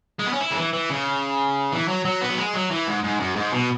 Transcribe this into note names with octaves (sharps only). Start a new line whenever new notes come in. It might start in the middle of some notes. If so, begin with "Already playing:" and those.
G#3
B3
C#4
E4
C#3
E3
E3
C#3
E3
F#3
F#3
B3
F#3
G#3
F#3
E3
G#2
G#2
F#2
G#2
B2